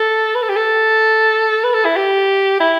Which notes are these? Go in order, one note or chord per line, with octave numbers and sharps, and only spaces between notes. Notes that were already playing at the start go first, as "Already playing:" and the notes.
Already playing: A4
B4
A4
G4
A4
B4
A4
E4
G4
E4